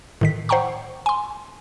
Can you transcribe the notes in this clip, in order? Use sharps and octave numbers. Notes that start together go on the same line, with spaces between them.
A2 D#3 B6
C5 F#5 G5 A#5 C#6
G#5 C6